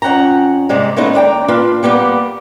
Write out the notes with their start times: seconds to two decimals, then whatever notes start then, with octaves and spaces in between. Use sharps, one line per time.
0.02 F2 C#4 F#5 G5 A#5
0.69 G#2 C3 G3 G#3
0.96 G#3 A3 B3 C#4 D#4 E4
1.14 D#2 D4 G5 A#5
1.48 A#3 D4 F4 B4
1.83 G3 A#3 B3 G4